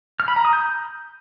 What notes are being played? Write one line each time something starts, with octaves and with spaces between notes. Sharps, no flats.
F6
B5
A#5
D#6
G6